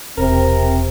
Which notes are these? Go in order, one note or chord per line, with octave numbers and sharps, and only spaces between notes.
E1 C3 C4 A#4